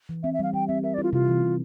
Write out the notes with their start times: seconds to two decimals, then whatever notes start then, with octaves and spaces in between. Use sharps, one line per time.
0.09 E3
0.23 C4 E5
0.34 E5
0.39 G3 F5
0.53 G3 G5
0.68 C4 E5
0.83 A#4 E5
0.94 D5
0.98 E4 F4
1.13 C3 F4
1.28 E3
1.43 C3